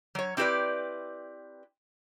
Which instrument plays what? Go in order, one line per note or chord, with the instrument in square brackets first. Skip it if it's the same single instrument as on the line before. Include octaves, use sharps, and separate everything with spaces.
[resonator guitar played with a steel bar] F#3 C#5
C4 E4 G4 A4 B4 D5